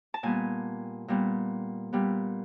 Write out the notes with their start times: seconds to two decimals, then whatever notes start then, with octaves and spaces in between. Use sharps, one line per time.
0.14 A5
0.23 A#2 G3 B3 G#5
1.08 A#2 G3 B3
1.93 A#2 G3 B3